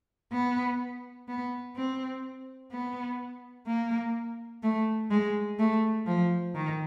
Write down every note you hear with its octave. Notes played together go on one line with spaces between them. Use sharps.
B3
B3
C4
B3
A#3
A3
G#3
A3
F3
D#3